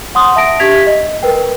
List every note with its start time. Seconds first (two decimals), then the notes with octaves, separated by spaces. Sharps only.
0.15 F#5 C6 D#6
0.36 E5 A5 D#6 A#6 D7
0.59 D4 G4 E5 G#6 B6 F7
0.87 D#5
1.23 A#4 B4 G5